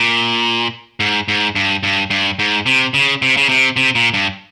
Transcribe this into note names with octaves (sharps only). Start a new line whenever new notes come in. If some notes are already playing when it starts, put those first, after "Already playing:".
Already playing: A#2
G#2
G#2
G2
G2
G2
G#2
C3
C#3
C3
C#3
C3
C3
A#2
G2